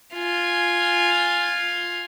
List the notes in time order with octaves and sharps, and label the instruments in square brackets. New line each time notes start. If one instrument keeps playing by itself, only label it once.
[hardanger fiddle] F4 G#5